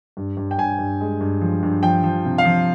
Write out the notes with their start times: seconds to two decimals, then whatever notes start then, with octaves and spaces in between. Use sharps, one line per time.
0.17 G2
0.37 G2
0.51 G5
0.58 G2 G#5
0.79 G2
1.01 G#3
1.21 G2
1.41 F3
1.63 G2
1.83 F3 G5
2.03 F3
2.25 C3
2.38 F5
2.45 F3